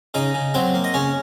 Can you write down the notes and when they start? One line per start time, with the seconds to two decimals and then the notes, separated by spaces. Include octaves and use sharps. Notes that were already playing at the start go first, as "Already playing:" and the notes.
0.14 C#3 D#4 D#5
0.34 C#3
0.54 F#3 C4 C5
0.74 A#3
0.84 D#5
0.94 C#3 C#4 C#5